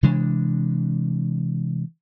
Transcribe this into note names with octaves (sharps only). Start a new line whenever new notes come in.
C3 E3 G#3 D4